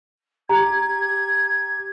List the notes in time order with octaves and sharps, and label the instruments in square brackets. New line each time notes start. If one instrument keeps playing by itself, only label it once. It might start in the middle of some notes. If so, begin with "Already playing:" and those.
[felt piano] G4 [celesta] A#5 [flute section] G#6